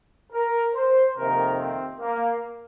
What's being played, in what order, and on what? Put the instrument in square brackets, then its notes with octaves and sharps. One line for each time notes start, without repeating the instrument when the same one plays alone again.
[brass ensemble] A#4
C5
F2 C3 D#3 A#3 A#4
C4
A#3